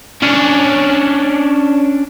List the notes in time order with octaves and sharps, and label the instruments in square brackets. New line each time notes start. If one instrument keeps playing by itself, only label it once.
[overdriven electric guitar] C#4 D4